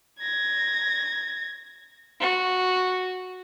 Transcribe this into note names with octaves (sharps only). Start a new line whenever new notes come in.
G#6 A#6
F#4